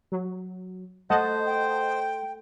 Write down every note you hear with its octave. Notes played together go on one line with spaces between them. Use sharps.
F#3
A3 C5 D#5 F#5 A5
G5